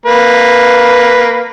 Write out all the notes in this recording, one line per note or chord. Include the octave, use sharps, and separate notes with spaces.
A#3 B4